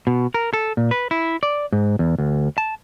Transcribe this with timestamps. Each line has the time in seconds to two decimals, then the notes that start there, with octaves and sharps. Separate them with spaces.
0.07 B2
0.34 A#4
0.53 A4
0.77 A#2
0.91 B4
1.11 E4
1.43 D5
1.72 G#2
1.99 E2
2.18 D2
2.58 A5